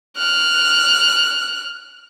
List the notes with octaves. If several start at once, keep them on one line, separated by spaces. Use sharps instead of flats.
F6 F#6